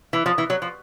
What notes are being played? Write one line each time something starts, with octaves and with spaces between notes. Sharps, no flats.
E3
F3
E3
F#3
F3